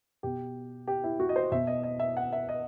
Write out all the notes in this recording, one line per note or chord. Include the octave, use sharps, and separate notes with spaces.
B2 G4
G4
E4
F#4
D#5
C5
B2 E5
D#5
D#5
E5
F#5
E5
D#5